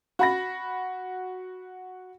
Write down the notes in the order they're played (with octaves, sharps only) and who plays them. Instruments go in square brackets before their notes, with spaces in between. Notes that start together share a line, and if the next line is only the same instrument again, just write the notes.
[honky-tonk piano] F#4 B5 A#6